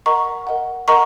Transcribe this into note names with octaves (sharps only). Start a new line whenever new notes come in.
A#4 D#5 F#5 A#5 C#6
A#4 D#5 F#5
A#4 D#5 F#5 A#5 C#6